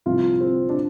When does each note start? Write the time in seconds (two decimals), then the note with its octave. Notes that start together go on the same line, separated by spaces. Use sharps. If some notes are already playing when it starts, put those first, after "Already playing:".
0.06 C2 C3 F3 F4
0.41 C4
0.69 D4